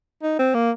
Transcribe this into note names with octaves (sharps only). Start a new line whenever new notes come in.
D#4
C4
A#3